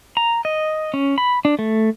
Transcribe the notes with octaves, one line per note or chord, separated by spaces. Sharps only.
A#5
D#5
C#4
B5
D4
A3